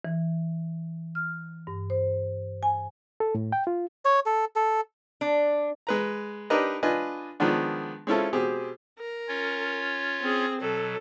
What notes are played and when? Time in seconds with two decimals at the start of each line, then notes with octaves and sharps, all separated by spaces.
0.05 E3
1.15 F6
1.67 G2
1.90 C5
2.63 G#5
3.20 A4
3.35 A2
3.52 G5
3.67 F4
4.05 C#5
4.26 A4
4.56 A4
5.21 D4
5.87 G#3 B4 A#5
6.50 D4 D#4 G4 A#4 B4 D#5
6.83 D4 F4 B4 D#5 G#5
7.40 D#3 F3 G#3 B3 D4
8.07 G#3 C4 C#4 E4 F4 A4
8.33 B2 C4 G4 G#4
8.99 A#4
9.28 C#4 F4 C#5
10.20 C4 G#4
10.60 B2 F#3 A4